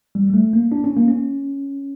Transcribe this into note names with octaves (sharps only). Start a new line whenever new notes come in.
G3
G3
A3
A#3
D4
C#4
A#3
C#4